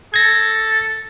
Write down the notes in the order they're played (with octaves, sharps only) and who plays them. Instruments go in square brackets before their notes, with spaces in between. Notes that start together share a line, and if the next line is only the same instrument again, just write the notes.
[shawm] A4 [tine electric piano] G#6 A#6